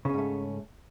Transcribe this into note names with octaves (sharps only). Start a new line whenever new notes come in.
G#2 C#3 A3 C#4